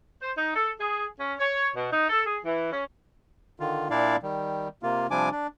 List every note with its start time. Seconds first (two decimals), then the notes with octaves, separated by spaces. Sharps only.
0.22 C5
0.38 D#4
0.56 A4
0.80 G#4
1.20 C#4
1.39 C#5
1.76 B2
1.92 D#4
2.09 A4
2.26 G#4
2.45 E3
2.72 C#4
3.60 D3 D#3 F4
3.91 A#2 D4 E4 D5 F5
4.23 D#3 G3
4.83 C3 A#3 F4
5.11 C3 F3 G3 D4 G#5 D6
5.32 D4